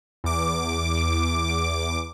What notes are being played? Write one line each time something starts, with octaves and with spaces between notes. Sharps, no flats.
E2 D6